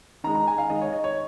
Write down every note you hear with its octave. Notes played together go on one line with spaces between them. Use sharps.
D#3 G#3 D#4 A#5
A#5
G#5
F5
D#3 G#3 D#4 D#5
C#5
D#5
C#5